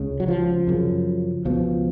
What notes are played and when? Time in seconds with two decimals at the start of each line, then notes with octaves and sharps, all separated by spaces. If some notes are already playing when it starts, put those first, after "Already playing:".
Already playing: C#2 C#3
0.20 F#3
0.28 F3
0.67 F#2 C#3
1.45 C#2 B2 F3